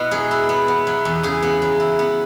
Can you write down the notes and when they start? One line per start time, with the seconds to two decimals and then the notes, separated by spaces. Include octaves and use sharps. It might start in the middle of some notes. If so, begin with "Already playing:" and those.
Already playing: B2 B3 E4 F#4 B4 D#5
0.11 F#3 G#4
0.31 E4
0.49 B3
0.68 B3
0.87 F#3
1.05 E2
1.23 C#3 G#4
1.42 B3
1.62 F#3
1.80 E4
1.99 B3